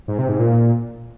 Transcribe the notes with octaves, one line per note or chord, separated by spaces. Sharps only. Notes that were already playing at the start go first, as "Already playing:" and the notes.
G#2
C3
G#2
A#2